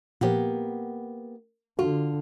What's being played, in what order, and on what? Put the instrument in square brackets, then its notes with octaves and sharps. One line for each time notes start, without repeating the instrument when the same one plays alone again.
[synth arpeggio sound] A#2 F3 [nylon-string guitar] A#3 B3 G4
[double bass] D3 [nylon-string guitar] F4 [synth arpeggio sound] F#4